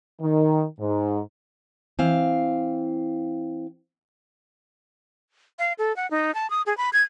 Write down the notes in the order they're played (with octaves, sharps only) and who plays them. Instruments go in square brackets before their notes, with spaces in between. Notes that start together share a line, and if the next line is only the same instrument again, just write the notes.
[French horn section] D#3
G#2
[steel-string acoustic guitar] E3 C4 F5
[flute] F5
A4
F#5
D#4
A5
D#6
G#4
B5
G#6